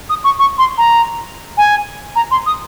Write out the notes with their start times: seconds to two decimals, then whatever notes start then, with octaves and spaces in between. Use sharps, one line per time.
0.10 D#6
0.24 C#6
0.39 C#6
0.58 C6
0.78 A#5
1.58 G#5
2.16 A#5
2.31 C6
2.46 D#6